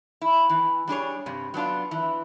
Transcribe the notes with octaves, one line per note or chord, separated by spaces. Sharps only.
E4
E3
G3 D4 G#4 C#5
G2 C3
F#3 B3 D4 F4
E3